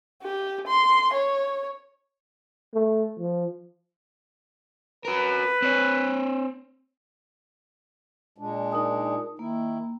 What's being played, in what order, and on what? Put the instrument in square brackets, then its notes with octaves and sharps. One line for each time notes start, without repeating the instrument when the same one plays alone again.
[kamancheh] G4
C6
C#5
[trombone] A3
F3
[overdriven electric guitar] F#4 A#4 [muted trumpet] B4
[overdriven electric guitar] C4 C#5
[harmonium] A#2 G#3 D4
[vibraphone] D#4 A#4 D#6
[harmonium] D#3 E4 [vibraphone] A#3